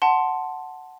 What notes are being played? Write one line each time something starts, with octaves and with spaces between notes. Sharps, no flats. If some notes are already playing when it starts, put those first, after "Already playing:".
F#5 A5 C6